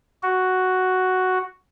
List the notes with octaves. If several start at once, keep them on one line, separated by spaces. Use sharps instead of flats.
F#4